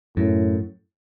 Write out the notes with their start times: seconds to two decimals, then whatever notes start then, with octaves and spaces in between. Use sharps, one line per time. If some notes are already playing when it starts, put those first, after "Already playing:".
0.17 F#2 A2